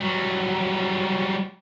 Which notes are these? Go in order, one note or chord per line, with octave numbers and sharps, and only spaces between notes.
F#3 G3